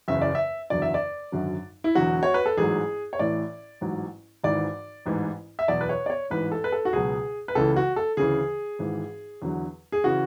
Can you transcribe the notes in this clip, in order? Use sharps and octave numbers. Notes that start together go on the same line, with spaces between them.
F#1 E2 C#3 E3 E5
D5
E5
F#1 E2 D3 F#3 D5
E5
D5
G#1 F#2 D3 F#3
E4
E1 E2 D3 F#3 F#4
C#5
B4
A4
A1 G#2 F#3 G#4
C#5
A1 A2 E3 D5
A1 G#2 F#3
G#1 G#2 E3 D5
A1 G#2 E3
E5
E2 B2 F#3 D5
B4
C#5
D5
C#5
A1 G#2 E3 B4
A4
B4
A4
F#4
C#2 B2 F#3 G#4
B4
C#2 C#3 E3 A4
F#4
A4
D2 C#3 E3 G#4
G#1 G#2 E3
E2 D3 F#3
G#4
C#3 E3 F#4